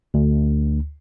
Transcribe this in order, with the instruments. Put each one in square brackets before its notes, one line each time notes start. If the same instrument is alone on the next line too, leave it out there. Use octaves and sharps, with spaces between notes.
[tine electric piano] D2